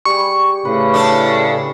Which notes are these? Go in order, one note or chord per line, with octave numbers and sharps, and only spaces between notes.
G3 G#4 C#6
A2 C#3 B4
D4 A4